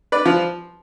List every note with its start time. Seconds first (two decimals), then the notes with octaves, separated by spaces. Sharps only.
0.12 B4 D5
0.26 F3